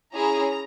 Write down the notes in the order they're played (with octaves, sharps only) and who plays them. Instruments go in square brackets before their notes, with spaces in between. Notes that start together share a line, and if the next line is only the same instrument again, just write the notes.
[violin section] C#4 E4 G#4 A#5